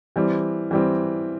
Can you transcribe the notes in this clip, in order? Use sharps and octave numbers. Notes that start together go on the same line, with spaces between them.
E3 G3 C4
E3 G3 C4